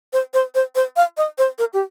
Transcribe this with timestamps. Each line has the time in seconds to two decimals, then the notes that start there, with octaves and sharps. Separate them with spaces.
0.13 C5
0.34 C5
0.55 C5
0.75 C5
0.96 F5
1.17 D#5
1.38 C5
1.58 A#4
1.73 G4